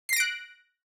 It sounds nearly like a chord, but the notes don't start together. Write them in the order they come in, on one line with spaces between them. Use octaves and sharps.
C7 A#6 D7 F#6